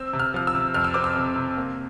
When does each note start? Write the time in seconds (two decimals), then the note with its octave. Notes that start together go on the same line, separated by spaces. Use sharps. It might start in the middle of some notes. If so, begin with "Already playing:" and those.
Already playing: C4 E6
0.13 C3
0.19 F6
0.34 F3 F6
0.47 E6
0.55 C3
0.74 F2 F6
0.84 E6
0.94 C4 D6
1.04 E6
1.16 C3
1.36 C3
1.57 A#3